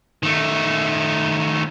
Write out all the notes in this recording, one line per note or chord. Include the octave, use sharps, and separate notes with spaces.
D#3 A3